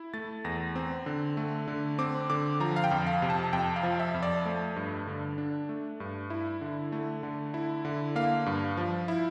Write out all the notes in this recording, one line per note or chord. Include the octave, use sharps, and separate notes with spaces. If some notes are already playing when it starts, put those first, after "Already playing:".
Already playing: E4
A3 A6
E2 A#6
C4
D3
A3
D3
C4 D6
D3 D6
F3 A#5
F5
G5
F2
F5
C3
A5
F2 G5
F5
F3
E5
F2
D5
A3
G2
D3
D4
A3
G2
E4
D3
A3
D3
E4
D3
A#3 F5
G2
F3
E4